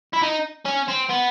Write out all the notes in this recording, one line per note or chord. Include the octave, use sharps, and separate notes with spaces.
E4
D#4
C#4
C4
B3